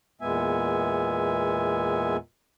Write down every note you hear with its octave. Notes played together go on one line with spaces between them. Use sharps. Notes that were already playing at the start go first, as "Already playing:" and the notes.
E2 A#2 G#3 B3 E5 G#5